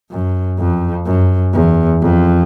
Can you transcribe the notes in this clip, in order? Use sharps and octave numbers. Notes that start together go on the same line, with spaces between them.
F#2
F2
F#2
E2
F2